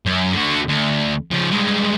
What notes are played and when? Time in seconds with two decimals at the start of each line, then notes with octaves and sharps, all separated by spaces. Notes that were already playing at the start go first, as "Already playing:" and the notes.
0.06 F#2
0.33 D3 F#4
0.69 D2
1.32 C#3 F3
1.52 G2 G#3